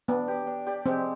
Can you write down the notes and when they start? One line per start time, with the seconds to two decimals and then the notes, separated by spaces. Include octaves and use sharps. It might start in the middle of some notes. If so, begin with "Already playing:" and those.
0.08 B3 D4
0.28 G4 D5
0.47 D4
0.67 G4 D5
0.86 G#3 C4